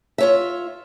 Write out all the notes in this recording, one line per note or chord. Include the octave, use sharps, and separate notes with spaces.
F4 C#5 E5